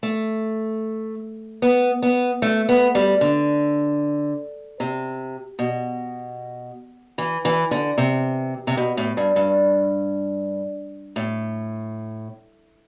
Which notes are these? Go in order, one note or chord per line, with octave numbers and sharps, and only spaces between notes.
A3
B3
B3
A3
B3
G3
D3
C3
B2
E3
E3
D3
C3
C3
B2
A2
G2
G2
A2